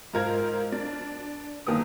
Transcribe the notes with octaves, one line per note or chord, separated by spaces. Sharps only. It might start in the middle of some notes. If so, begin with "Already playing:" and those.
G#2 F4 A#4 C5 G#6
D4
G1 D#3 A#3 B3 D#6